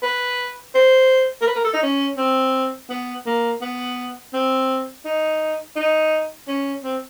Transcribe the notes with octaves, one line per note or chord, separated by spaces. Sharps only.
B4
C5
A#4
B4
A#4
A4
D#4
C#4
C4
B3
A#3
B3
C4
D#4
D#4
C#4
C4